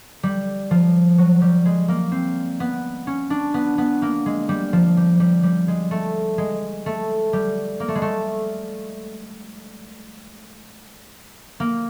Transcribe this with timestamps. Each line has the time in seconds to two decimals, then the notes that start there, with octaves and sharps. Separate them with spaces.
0.23 G3
0.71 F3
1.18 F#3
1.42 G3
1.65 G#3
1.88 A#3
2.12 C4
2.60 B3
3.07 C#4
3.30 D4
3.54 B3
3.78 B3
4.02 A#3
4.26 G#3
4.49 G3
4.73 F3
4.97 G3
5.20 G3
5.43 G3
5.68 G#3
5.91 A3
6.38 G#3
6.86 A3
7.33 G3
7.80 A#3
7.88 A3
7.95 G#3
8.02 A3
11.60 A#3